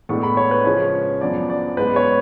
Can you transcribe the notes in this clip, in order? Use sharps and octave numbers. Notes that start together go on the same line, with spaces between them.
A2 G#3 B3 D4 C#6
B5
C#5
B4
C#3 F3 G#3 C#4 C#5
F#2 F3 B3 D4 D5
D5
G#2 G#3 B3 B4
C#5